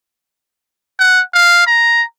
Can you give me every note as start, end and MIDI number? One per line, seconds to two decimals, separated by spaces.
0.99 1.20 78
1.34 1.64 77
1.67 2.02 82